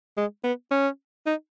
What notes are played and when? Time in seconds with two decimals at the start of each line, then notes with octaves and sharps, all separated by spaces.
0.17 G#3
0.44 B3
0.71 C#4
1.26 D#4